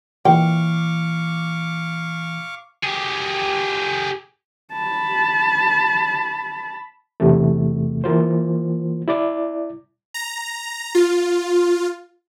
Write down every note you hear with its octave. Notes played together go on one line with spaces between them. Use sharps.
A#2 E3 F5 G5 C#6 D6
G4 G#4
A5 B5
E2 C3 A3
E3 A#3 F4 C5
E4 D5 D6
A#5
F4